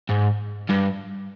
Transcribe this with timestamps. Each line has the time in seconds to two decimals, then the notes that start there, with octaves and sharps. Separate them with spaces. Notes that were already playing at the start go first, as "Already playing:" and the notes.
0.10 G#2
0.69 G2